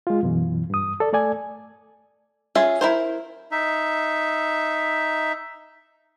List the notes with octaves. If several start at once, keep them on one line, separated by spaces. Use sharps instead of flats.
G#3 F4
F#2 B2 E3
G2 D#6
A4 D5
A3 A4 D5 G#5
C#4 F4 G#4 E5
E4 A#4 C5
D#4 E5